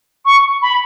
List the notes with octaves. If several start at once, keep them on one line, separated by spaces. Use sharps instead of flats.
C#6
B5